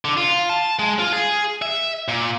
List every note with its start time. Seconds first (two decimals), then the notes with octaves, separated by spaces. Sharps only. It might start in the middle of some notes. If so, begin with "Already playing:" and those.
0.05 D3
0.17 F4
0.49 A5
0.79 G#3
0.99 F4
1.13 G#4
1.62 E5
2.08 A#2